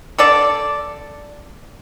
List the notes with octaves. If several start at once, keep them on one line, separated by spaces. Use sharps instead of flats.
D3 A4 D5